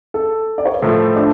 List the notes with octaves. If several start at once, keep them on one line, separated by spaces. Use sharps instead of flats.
A4
D5
C#5
B4
A2 F3 A3 A4
D4